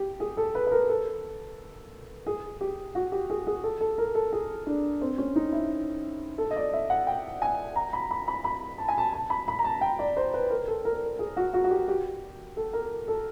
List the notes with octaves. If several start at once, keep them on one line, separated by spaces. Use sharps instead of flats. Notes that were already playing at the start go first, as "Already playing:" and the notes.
Already playing: G4
G#4
A4
B4
B4
A#4
A4
G#4
G4
F#4
G4
G#4
G#4
A4
A4
A#4
A4
G#4
D4
C4
C#4
D#4
E4
A4
D#5
D5
E5
F#5
G5
G#5
A#5
B5
B5
B5
B5
A5
G#5
A5
A5
B5
B5
A#5
A5
G5
D5
C5
B4
A#4
A4
A#4
G#4
F#4
F#4
F#4
G4
G4
A4
A#4
A4